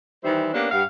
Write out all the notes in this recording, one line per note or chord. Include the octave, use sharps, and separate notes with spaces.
D#3 E3 G3 E4 C5
A#3 B3 C#4 D4 G4 A#4
G2 F5 F#5